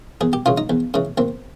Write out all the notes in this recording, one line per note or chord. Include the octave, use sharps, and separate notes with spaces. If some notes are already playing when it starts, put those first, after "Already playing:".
E2 G#4
G4
C#3 E3 F4
D#4
E2
C#3 E3
D#2 C4